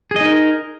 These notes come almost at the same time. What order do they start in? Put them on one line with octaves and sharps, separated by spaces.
G#4 D#5 D#4 A#4